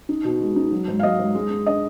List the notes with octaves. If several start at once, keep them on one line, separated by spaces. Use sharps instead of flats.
D#4
B2
G#3
D#4
F#3
G#2
F5
F#3 D#5
G#2
G#3
G#3
D4 D#5